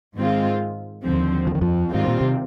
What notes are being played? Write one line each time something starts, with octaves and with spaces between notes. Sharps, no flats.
G#2 D#3 G#3 C4 F4
D#2 D3 F3 C4
F3
D#3
F2 F3
G#2 D#3 G3 C4 F4
A#2
C3